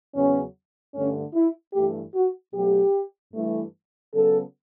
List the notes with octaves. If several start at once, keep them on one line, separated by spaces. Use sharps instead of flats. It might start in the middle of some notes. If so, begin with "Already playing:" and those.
E2 C#3 F#3 B3 C#4
G2 D3 A3 C#4
E4
G2 E3 A3 G4
F#4
B2 F#3 A3 G4
G2 E3 A3
C#3 F#3 B3 A4